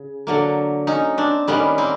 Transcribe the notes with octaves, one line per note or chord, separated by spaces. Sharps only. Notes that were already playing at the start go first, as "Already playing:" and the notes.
Already playing: C#3
D3 F#3 A#3
C#4 D#4
C4 D4
D#3 G3 A#3 B3 C#4
A#3 C4